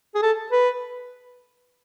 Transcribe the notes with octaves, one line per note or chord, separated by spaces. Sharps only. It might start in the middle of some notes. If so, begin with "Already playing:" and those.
G#4
A4
B4